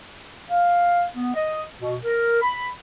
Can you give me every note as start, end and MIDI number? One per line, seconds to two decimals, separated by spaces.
0.49 1.03 77
1.15 1.34 59
1.34 1.62 75
1.78 1.95 47
2.04 2.40 70
2.41 2.67 83